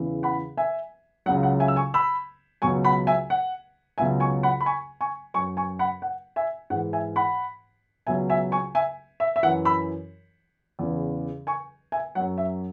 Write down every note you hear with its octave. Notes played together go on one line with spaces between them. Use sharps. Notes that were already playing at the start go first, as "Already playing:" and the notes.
Already playing: E2 C#3 E3
F#5 B5
E5 G#5
C#2 C#3 F#3 F#5
F#5
E5 G#5
E6
G#5 C#6
B5 E6
C#2 B2 F#3 G#5 C#6
F#5 B5
E5 G#5
F#5
C#2 B2 F#3 E5 G#5
G#5 C#6
F#5 B5
B5
G#5 C#6
G#5 C#6
F#2 F#3 G#5 C#6
G#5 C#6
F#5 B5
F#5
E5 G#5
G#2 E3 F#5
E5 G#5
F#5 B5
C#2 B2 F#3 E5 G#5
E5 G#5
G#5 C#6
E5 G#5
E5
E5
F#2 E3 F#5
B5 E6
E2 C#3 E3
G#5 C#6
E5 G#5
F#2 F#3 F#5
E5